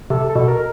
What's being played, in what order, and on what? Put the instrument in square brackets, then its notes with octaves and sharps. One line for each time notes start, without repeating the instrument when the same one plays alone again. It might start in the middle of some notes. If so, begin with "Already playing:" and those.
[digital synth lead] C3 [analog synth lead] A4
[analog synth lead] A4
[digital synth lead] B2
[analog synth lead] A#4